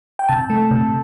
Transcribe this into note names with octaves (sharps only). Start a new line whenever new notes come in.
G5
C3 A5
A3
C3